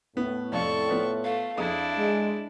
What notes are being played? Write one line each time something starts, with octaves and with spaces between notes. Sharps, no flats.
A2 B3
F2 C3 A4 D5 F5 C#6
F3 B3
A3 F5
F2 D4 E4 G#4 D#6
G#3